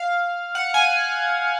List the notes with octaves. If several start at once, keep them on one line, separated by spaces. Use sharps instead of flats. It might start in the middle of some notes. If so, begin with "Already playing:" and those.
Already playing: F5
F#5
G#5